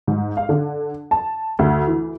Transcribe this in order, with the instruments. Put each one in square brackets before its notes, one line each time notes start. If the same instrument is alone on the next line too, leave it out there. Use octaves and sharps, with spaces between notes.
[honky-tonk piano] G#2
F5
D3
A5
D2
E3